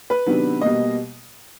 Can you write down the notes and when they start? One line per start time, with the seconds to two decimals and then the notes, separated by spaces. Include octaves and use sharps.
0.10 B4
0.26 C3 D#3 F#3 B3 D4
0.61 B2 G3 A#3 D#5